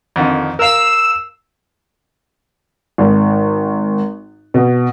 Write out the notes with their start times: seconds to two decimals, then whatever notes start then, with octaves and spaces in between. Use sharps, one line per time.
0.16 F2 D3 D#3
0.59 A#4 F5 E6
2.98 G#1
4.54 B2